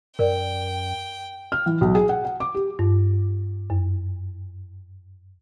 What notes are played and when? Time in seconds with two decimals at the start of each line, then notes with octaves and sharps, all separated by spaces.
0.19 F#2 A#4 C5 D5 G5
1.52 F6
1.66 E3
1.81 B1
1.95 G#4
2.09 F#5
2.25 F#5
2.40 D6
2.55 G4
2.79 G2
3.70 F#2